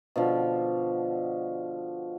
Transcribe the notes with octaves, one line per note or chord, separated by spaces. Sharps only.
B2 D3 F3